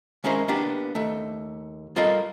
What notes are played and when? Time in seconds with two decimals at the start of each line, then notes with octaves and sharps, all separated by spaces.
0.24 D#3 G#3 C#4 E4 A#4 C5
0.48 A#3 B3 D4 G4
0.95 D#2 A3
1.96 G3 F4 A4 A#4 D#5 F5